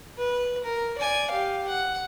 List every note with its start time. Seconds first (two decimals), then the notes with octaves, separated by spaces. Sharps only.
0.18 B4
0.64 A#4
0.98 D5 G#5
1.30 G4 F5
1.67 F#5